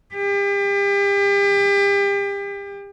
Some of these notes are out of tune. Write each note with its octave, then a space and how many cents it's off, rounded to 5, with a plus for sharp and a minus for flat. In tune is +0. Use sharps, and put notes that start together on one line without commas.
G4 +35